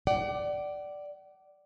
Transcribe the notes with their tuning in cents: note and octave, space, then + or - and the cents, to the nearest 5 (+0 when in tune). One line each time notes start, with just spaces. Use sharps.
D5 +0 F#5 +40